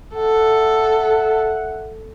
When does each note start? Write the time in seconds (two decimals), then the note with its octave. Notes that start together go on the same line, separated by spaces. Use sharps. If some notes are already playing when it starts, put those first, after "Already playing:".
0.16 A4 E5 F#5